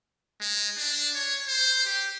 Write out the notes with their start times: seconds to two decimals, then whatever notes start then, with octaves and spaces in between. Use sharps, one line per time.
0.41 G#3
0.77 D4
1.15 C#5
1.48 C5
1.86 G4